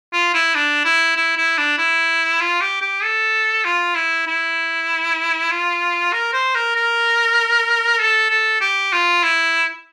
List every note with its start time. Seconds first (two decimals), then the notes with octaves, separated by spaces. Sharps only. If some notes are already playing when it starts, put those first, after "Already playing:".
0.13 F4
0.34 E4
0.55 D4
0.85 E4
1.16 E4
1.37 E4
1.58 D4
1.78 E4
2.41 F4
2.61 G4
2.81 G4
3.03 A4
3.65 F4
3.95 E4
4.27 E4
5.51 F4
6.13 A#4
6.33 C5
6.55 A#4
6.75 A#4
7.99 A4
8.30 A4
8.61 G4
8.92 F4
9.23 E4